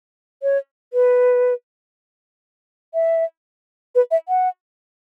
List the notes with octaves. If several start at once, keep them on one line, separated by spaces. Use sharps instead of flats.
C#5
B4
E5
B4
E5
F#5